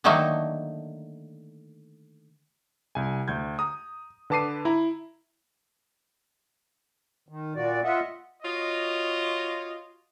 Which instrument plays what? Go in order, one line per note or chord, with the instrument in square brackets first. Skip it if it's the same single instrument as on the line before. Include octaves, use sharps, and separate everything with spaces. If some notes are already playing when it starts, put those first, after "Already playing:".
[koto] D3 D#3 F#3 A3 A#3 D#4
[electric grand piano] C2 G#5
D2 G6 G#6
A#5 D#6
D3 B4 A5 D6 C7 D#7
E4 A#5 B5
[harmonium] D#3
A#2 F#4 D5
F4 D#5 E5 F#5
[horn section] F4 F#4 C#5 D#5